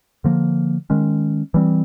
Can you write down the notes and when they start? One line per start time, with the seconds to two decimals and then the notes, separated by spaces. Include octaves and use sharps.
0.24 D3 F3 A#3
0.90 D#3 G#3 C#4
1.54 E3 G3 C4